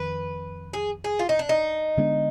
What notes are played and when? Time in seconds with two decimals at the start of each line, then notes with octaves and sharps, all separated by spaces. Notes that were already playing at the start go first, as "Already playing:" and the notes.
Already playing: F2 D#3 B4
0.73 G#4
1.04 G#4
1.19 F4
1.29 D#4
1.39 D4
1.49 D#4
1.97 D3 G#3 B3 D4